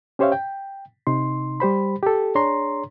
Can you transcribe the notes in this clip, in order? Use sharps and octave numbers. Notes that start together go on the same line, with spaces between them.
C#4 G4 C5 C#5 E5 F5
G5
C3 D#4 C6
G3 G4 C5 B5
G4 A4
D4 G#4 C#5 A#5 C6